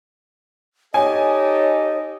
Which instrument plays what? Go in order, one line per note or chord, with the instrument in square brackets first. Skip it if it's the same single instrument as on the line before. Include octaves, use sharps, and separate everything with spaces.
[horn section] D#4 G4 A4 [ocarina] C#5 [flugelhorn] D#5 [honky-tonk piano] G#5